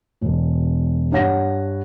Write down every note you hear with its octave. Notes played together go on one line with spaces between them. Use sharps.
E1 B2
G2 C#5 F#5 A#6